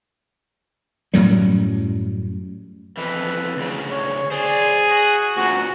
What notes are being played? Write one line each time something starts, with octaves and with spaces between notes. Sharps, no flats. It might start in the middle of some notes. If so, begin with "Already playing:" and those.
F#2 A2 F#3 G3
F2 E3 B4
D2 C#3
C#5
G#4 C5 D5
F#4
D2 A#2 F#4